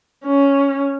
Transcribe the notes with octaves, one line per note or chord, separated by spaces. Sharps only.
C#4